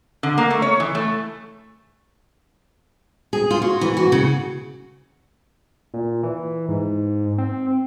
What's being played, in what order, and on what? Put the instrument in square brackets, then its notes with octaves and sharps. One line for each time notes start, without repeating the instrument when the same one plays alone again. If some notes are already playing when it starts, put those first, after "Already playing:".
[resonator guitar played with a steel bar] D3
A#3
A3
C#5
E3
A3
[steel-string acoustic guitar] G#4
F4
F#4
E3
F#4
C#3
[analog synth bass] A#2
E3
G#2
C4